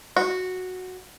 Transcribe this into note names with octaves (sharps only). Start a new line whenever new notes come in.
F#4